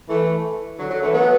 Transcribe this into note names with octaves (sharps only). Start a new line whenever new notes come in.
E3 A3
D3 F#3
D3 F#3
E3 A3
F#3 B3